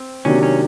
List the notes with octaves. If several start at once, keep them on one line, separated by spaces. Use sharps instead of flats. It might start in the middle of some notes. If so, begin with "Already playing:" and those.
Already playing: C4
C3 D#3 F#3 A#3 C#4 D4
C#4